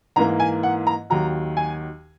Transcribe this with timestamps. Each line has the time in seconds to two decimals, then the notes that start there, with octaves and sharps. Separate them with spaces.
0.16 G#2 E3 A#3 A#5
0.40 G#5
0.63 F#5
0.87 A#5
1.10 D#2 D#3 F#3 A#5
1.57 G#5